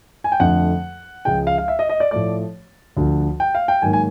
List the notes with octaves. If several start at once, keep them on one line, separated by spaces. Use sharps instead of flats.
G#5
G5
F2 D3 F3 A3 F#5
C#2 C#3 F3 G#3 G5
F5
F5
E5
D#5
D#5
D5
A2 F3 A3 D5
D2 D3 F3
G5
F5
G5
G#2 D#3 F#3 A#3 G#5
G#5